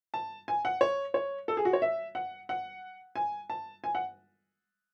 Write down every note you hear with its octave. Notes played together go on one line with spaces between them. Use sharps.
A5
G#5
F#5
C#5
C#5
A4
G#4
F#4
C#5
E5
F#5
F#5
G#5
A5
G#5
F#5